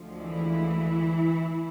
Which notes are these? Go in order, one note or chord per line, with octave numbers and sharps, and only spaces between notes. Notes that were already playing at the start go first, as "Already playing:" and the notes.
Already playing: D2 D3 F3 G#3
E3 E4